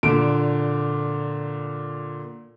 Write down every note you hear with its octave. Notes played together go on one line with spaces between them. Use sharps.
A#2 D3 D7